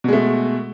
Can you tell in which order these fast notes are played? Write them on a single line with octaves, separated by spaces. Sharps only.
B2 G#3 A3